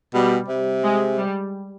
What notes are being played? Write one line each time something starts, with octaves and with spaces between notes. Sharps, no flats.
B2 G3
C3
G#3
G3